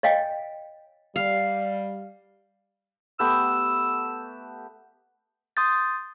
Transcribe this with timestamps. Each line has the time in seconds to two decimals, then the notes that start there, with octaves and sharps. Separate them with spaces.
0.03 C#5 D#5 F5 G5 G#5
1.16 G3 F5
3.20 A3 B3 G4 E6
5.57 C6 D#6 G6 A6